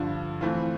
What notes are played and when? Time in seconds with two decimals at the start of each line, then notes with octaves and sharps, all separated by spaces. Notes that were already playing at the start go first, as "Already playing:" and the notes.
Already playing: G2 D3 F3
0.41 E3 A3 C4 F4